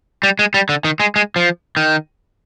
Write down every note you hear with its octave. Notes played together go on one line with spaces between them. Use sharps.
G3
G#3
G3
D3
D#3
G#3
G#3
F3
D#3